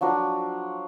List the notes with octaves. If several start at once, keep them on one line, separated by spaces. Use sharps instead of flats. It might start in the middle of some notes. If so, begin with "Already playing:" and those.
F3 F#3 D4 A#4